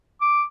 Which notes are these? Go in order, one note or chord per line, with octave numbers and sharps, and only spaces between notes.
D6